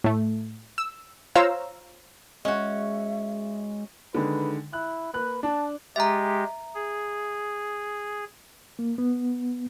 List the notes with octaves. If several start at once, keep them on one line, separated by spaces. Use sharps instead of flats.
A2 A3
E6
F4 C5 C#5 F5 A#5 E6
G#3 C#4 F#4 D#5 E5
D3 D#3 G#3 B4
E4 F#6
A#3 B4 F#6
D4 A5
G#3 G4 E5 A#5
G#4
A#3
B3